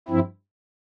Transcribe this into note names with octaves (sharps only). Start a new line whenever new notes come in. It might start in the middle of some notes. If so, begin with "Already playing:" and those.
G2 F3 C4 E4